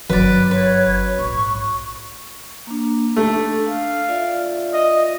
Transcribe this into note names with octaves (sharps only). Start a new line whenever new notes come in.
G1 F#2 D#3 B4 D5
B4 C#5
A#1 G#2 C#6
A#3 D4
A3 D4
F5
F4 D5 E5
D#5